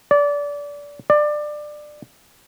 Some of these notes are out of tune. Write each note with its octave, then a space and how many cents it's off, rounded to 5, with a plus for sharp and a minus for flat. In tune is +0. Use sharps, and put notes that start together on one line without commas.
D5 -25
D5 +20